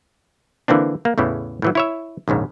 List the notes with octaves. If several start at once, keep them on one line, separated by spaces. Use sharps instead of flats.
D3 E3 A#3 C4 D4
A#3
E2 A2 C#3 E3
A2 E3 F#3
E4 C#5 E5
A#1 D#2 G#2 C#3